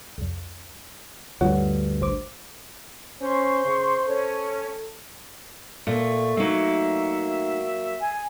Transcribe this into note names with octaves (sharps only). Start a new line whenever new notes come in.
C2 F2
D2 G2 F4 C#5 F#5
A1 C5 D6
C#4 C5 C6 C#6
C#3
C#4 A4 C#5
A#2 A3
F#3 A3 A#3 D#4 E5
G#5